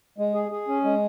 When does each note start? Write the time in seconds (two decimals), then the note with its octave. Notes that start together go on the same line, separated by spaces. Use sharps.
0.18 G#3
0.34 G#4
0.52 G#4
0.68 C#4
0.84 G#3